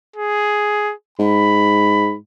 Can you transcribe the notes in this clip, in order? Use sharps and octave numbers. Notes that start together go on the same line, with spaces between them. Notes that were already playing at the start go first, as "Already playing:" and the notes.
G#4
G#2 B5